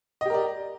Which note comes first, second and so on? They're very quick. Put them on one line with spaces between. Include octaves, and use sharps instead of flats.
D#5 G4 A#4 D5